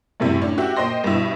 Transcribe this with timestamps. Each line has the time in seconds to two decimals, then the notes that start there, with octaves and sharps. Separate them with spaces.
0.20 F#2 A2 C3 G3 E4
0.41 A2 C#4 D4
0.58 F#4 G4 E5
0.76 A#2 C5 D#5 G5 C6 A#6
1.04 G2 B2 E4